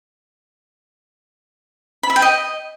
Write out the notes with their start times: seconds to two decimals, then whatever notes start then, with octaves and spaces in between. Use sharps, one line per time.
2.03 B5
2.10 E5
2.16 G5
2.22 D#5